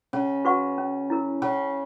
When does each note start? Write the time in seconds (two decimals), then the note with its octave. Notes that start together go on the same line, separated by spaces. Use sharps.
0.13 C#3 C#4
0.45 F#4 B4 F#5 C#6
0.78 C#4
1.10 E4 A#4
1.42 C#3 C#4